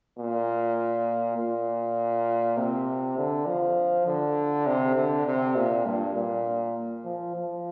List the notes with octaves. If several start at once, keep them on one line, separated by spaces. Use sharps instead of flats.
A#2
A#2
C3
D3
F3
D3
C3
D3
C3
A#2
G2
A#2
F3
F3